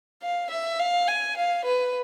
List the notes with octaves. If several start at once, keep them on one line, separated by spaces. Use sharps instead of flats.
F5
E5
F5
G#5
F5
B4